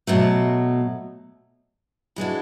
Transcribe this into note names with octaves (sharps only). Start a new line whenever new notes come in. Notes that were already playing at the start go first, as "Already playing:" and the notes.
B2 F#3 A3
E3 G#3 D4 F#4